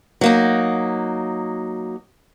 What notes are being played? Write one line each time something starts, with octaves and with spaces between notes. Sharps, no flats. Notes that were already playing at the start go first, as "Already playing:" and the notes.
F#3 A#3 D#4